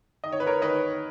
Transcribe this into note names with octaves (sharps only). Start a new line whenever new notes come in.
D#3 D#5
C#5
B4
A#4 C#5
D#3 B4 D#5